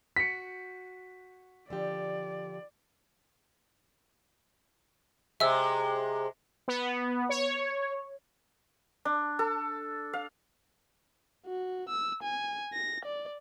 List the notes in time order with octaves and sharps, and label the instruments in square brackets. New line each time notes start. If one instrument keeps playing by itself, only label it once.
[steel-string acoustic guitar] F#4 [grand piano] B6 C#7
[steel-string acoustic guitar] D3 F3 G4 [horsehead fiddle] D5
[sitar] C3 G#3 [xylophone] E5 E6
[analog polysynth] B3
C#5
[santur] D4
A4
F5
[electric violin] F#4
E6
G#5
A#6
D5